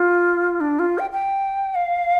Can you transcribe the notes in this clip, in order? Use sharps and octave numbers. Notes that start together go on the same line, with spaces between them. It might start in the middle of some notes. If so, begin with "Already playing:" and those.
Already playing: F4
D4
F4
G5
G5
F5